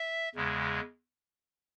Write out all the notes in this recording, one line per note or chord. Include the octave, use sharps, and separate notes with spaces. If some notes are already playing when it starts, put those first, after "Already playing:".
Already playing: E5
E2 C#3 G#3